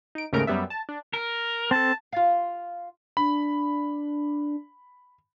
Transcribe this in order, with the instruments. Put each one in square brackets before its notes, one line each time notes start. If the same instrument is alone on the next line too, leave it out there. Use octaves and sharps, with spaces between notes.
[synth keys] D#4 D7
D#2 G#2 C#3 A3 A#4 D7
F#2 G3 B3 E5
A5
D4
[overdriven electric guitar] A#4
[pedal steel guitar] C4 A4 [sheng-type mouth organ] A5
[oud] F4 F5
[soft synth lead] D4 [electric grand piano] B5